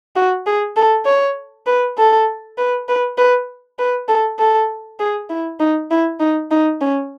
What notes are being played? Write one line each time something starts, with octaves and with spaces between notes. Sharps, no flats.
F#4
G#4
A4
C#5
B4
A4
B4
B4
B4
B4
A4
A4
G#4
E4
D#4
E4
D#4
D#4
C#4